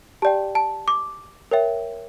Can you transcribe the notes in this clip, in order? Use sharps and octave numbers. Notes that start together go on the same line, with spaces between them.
G4 D5 G5 A5
A5
D6
A#4 C#5 E5 G5